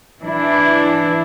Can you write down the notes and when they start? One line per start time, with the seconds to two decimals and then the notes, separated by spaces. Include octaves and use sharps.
0.21 E3 D4 E4